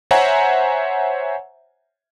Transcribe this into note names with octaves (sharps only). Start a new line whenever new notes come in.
C5 C#5 E5 F#5 G#5 A#5